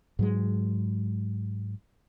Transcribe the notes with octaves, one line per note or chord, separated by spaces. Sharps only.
G#2 F#3 G#3